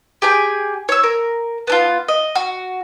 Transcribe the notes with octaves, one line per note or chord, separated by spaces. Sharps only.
G4 G#4 G5 G#5
C#5 E6
A#4
B3 D4 F4
D#5
F#4